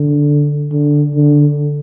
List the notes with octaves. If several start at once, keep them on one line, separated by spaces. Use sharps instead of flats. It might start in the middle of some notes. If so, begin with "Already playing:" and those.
Already playing: D3
D3
D3